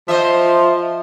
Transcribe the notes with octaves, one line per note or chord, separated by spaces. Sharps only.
F3 C5 D#5 E5